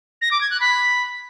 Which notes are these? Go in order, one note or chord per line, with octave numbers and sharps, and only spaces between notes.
A#6
D6
G#6
F#6
B5